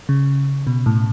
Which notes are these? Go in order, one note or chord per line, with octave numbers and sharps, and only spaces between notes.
C#3
B2
A2